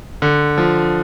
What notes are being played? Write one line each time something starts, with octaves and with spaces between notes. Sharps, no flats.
D3
F3